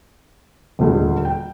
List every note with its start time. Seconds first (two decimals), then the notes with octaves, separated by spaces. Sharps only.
0.79 D#1 D2 G#3
1.25 G5